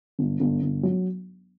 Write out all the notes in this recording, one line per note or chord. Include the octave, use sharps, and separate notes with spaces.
G1
G1
G1
F#3